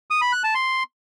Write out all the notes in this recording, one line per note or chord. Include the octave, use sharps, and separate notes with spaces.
D#6
B5
F#6
A5
C6